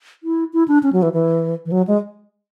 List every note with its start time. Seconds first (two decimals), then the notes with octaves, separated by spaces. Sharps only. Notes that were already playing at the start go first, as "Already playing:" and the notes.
0.23 E4
0.53 E4
0.68 D4
0.83 C#4
0.93 F#3
1.02 E3
1.13 E3
1.66 E3
1.72 F#3
1.87 G#3